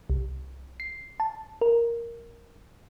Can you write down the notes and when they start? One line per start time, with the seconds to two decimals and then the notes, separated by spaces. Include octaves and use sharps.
0.10 C2
0.80 C7
1.20 A5
1.61 A#4